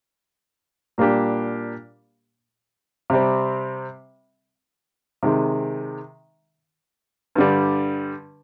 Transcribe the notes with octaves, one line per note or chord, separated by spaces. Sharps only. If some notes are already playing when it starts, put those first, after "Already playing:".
A#2 G3 A#3 D4 G4
C3 G3 C4
C3 D#3 G#3
G2 D3 G3